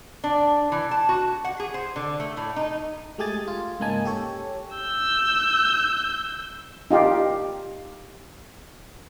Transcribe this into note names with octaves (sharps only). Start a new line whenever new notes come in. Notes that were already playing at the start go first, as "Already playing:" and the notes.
D4
E3
A5
F#4
F#5
G#4
C5
D3
A3
A2
D#4
G#3 A3 G4 G#4 G#5 A6
F4
G#2 C#3 A#3 D#4 G#5 A5
G4 A4 C#5
E6 G6
D#4 F4 G4